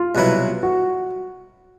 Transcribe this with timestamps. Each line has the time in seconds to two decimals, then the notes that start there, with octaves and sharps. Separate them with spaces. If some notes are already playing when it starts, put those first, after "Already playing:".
Already playing: F4
0.15 C2 B2 F#3 B3 E4
0.63 F#4